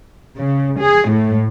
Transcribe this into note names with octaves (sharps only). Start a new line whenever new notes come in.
C#3
G#4
A2